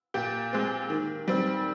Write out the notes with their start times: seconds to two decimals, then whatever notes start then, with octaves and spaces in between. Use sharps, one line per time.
0.14 A#2 G4
0.53 G#3 C4
0.90 D#3
1.28 G3 C4